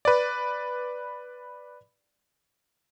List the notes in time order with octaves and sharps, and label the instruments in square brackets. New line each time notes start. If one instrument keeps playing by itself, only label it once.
[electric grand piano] B4 D5